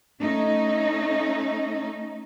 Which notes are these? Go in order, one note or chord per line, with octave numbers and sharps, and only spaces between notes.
A3 C#4 D#4